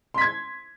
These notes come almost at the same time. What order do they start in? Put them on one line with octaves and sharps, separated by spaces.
C6 B6 G#6